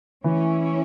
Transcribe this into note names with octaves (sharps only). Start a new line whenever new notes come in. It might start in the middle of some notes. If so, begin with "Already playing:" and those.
E3 A3 C#4 E4